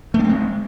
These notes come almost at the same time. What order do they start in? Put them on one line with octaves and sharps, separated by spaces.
A3 D4 C4 G#3